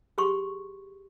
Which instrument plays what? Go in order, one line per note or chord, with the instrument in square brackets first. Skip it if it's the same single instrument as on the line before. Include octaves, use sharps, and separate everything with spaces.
[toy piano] G4 G#4 C6 C#6